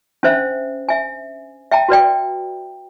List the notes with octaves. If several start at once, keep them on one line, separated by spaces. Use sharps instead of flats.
C#4 D4 C5 E5
E5 G#5
E5 G5 A5 A#5
F#4 B4 D5 G5